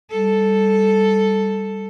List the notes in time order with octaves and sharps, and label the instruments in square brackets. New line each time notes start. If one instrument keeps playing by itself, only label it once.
[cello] G3 A4